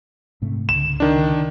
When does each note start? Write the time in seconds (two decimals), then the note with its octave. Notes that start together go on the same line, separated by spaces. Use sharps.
0.42 G#2 C3 A3
0.69 C#2 D3 E7
1.00 D#3 D4